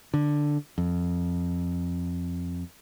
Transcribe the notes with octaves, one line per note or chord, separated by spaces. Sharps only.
D3
F2